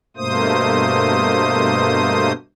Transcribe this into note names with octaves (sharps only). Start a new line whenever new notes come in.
G2 B2 A3 A#3 C5 D#6